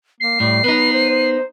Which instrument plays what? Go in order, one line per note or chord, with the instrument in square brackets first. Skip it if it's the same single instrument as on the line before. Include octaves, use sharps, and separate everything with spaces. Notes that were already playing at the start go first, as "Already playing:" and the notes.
[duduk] A#3 [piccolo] C7
[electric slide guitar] A2 [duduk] G3
[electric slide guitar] B3 D#4 [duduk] B4
[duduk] C5
C5